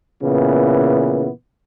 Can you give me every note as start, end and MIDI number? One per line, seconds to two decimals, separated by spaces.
0.23 1.29 46
0.23 1.29 49
0.23 1.29 52
0.23 1.29 59